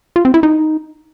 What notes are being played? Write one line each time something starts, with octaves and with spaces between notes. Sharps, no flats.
F4
C4
E4
D#4